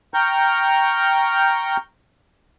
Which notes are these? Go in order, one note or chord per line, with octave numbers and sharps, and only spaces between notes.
G5 A#5 C#6 F6 G6